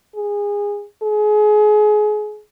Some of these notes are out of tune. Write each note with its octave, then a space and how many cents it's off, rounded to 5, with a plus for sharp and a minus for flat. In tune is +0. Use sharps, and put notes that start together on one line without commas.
G#4 -20
G#4 +30